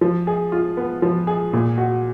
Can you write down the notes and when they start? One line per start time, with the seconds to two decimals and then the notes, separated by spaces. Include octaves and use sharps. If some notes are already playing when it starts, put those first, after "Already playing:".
0.01 F3
0.27 G#4
0.52 F4
0.77 B3
1.02 F3
1.27 G#4
1.53 A#2
1.78 F#4